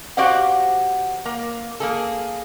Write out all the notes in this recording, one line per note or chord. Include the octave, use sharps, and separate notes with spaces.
F#4 G4 C5 D5 F5 F#5
A#3
A#3 G#4 A4